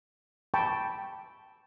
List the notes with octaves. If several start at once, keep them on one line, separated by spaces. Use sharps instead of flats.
G5 A5 B5 C#6